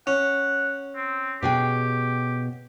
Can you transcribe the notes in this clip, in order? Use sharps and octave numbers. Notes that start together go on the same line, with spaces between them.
C#4 F#5
C4
B2 G4 G#4 G5